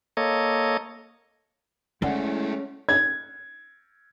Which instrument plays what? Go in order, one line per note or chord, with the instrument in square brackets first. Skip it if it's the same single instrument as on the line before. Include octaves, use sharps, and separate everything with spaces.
[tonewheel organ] A#3 A4 C#5 D#5
[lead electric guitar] G#3 A3 [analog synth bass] C#4 [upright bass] E4 [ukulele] D5 F#5
[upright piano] G#6